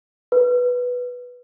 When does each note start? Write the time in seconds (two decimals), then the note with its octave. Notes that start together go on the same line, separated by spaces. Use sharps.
0.32 B4